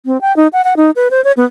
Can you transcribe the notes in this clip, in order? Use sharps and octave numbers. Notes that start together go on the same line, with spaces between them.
C4
G5
D#4
F#5
F#5
D#4
B4
C5
C#5
B3